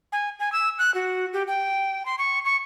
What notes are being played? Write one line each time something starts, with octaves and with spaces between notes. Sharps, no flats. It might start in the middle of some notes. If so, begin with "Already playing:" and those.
G#5
G#5
E6
F#6
F#4
G4
G5
C6
C#6
C#6